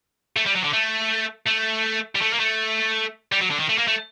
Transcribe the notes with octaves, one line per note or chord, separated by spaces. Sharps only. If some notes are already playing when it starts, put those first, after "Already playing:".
A3
G3
F#3
D3
A3
A3
G3
A3
A#3
A3
G3
F#3
D3
D#3
A3
A#3
A3